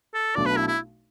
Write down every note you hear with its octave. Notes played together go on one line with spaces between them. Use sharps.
A4
B1 B2 A3 D4 F#4 D5
B4
E4
E4